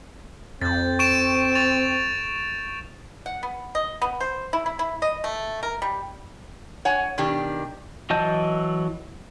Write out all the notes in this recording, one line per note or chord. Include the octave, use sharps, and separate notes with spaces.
F2 C4 G6 A6
C#6 D7 E7
C#6 A6 F7
F#5
B3
D#5
B3
C5
E4
E4
E4
D#5
A3
A#4
G3
C#5 F#5 G#5
B2 D#3 D4 G4
E3 F#3 D#5 A5 G6